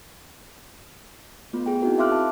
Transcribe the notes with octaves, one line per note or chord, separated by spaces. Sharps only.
A3 B3 F4
G#4 G5
C4 D#4 E4 F#4 A#4
E5 F5 C6 D6 F6 F#6
A5